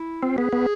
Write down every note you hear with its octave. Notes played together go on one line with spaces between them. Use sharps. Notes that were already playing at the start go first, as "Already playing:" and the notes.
Already playing: E4
C4 F4
B3 G#4
B3